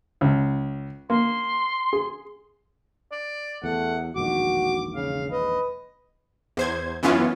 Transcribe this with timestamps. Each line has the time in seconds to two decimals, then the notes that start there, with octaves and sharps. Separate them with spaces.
0.21 C#2
1.10 A#3 C6
1.93 G#4
3.12 D5
3.64 E2 A3 F#5
4.16 E1 A#1 D#3 F#4 D6
4.95 C#3 F5
5.32 B4 D#5
6.57 E2 C5 G#6
7.03 F#2 E3 B3 C#4 F4